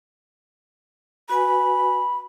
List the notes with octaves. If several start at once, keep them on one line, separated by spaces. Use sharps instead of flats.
F#4 B4 G#5 B5